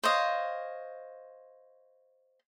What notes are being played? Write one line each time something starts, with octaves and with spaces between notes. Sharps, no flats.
C5 C#5 D#5 F5